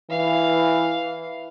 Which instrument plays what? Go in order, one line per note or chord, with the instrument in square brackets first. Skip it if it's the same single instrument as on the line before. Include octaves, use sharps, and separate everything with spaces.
[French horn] E3 [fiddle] F5